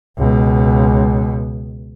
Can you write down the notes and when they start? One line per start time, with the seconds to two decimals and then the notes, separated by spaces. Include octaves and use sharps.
0.18 C#2 B2